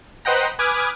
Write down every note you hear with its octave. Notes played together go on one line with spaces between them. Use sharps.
B4 C5 D#5 F#5 G5 A#5
B4 G#5 D6 D#6 F6 G#6